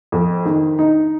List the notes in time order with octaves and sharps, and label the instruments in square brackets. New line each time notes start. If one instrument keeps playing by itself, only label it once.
[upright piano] F2
D#3
D#4